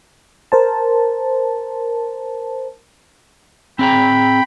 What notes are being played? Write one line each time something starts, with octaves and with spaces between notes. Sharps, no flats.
A#4 C5 A5
C4 G#4 G5 A#5 B5